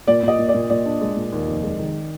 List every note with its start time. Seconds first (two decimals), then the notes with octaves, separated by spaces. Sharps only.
0.07 A#2 D5
0.23 A#2 D#5
0.39 A#2
0.49 D5
0.55 A#2
0.70 A#2 D5
0.86 D4
1.01 G#3
1.16 A#2
1.32 D#2
1.48 F1
1.63 G#3
1.79 D#3